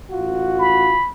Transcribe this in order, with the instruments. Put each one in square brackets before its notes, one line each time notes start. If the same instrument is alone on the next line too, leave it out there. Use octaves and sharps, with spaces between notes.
[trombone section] A1 F4 F#4
[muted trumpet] B5